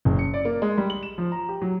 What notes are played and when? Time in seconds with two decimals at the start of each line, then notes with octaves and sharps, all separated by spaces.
0.05 F#1
0.19 C#7
0.34 D5
0.45 A#3
0.62 G#3
0.78 G3
0.90 F#7
1.03 E7
1.18 F3
1.32 A#5
1.49 G4
1.62 F#3